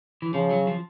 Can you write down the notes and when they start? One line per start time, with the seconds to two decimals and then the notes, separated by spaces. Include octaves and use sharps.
0.22 E3
0.33 C#3 F3
0.51 F#3
0.67 F3